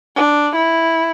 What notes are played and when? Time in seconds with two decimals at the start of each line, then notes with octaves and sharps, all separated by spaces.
0.16 D4
0.55 E4